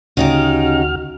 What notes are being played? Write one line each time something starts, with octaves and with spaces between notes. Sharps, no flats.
D2 C#3 D#4 F#4 G4 F6